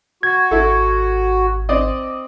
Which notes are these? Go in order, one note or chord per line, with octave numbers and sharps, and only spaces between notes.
F#4 G#6
G#1 E4 A4
C4 D5 D#5